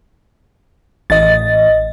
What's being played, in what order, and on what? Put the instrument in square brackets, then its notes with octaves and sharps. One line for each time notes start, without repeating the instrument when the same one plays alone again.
[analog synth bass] A1 [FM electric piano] D#5 A6